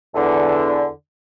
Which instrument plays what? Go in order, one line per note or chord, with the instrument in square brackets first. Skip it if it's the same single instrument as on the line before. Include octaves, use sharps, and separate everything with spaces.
[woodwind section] E2 D3